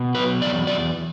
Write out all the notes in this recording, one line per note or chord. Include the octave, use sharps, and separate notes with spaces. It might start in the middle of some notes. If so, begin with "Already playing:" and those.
Already playing: B2
F#3 B4
E2 D5
E2 D5